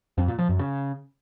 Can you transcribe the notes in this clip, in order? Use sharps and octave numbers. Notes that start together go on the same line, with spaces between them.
F2
A#2
F3
F#2
C#3